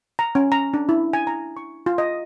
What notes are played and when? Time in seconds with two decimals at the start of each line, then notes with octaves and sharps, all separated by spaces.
0.19 A#5
0.35 C#4
0.52 A#5
0.74 D4
0.89 E4
1.13 G#5
1.27 A#5
1.57 C#6
1.86 F4
1.98 D#5